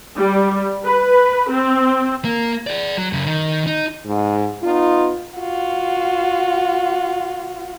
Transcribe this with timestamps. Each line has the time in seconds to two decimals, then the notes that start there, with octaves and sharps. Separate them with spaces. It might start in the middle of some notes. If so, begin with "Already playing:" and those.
0.16 G3
0.83 B4
1.50 C4
2.25 A#3
2.67 G#4 D5
2.97 F#3
3.13 F#2 C#3
3.26 D#3
3.67 D#4
4.06 G#2
4.63 B3 D#4 F4
5.38 F4 F#4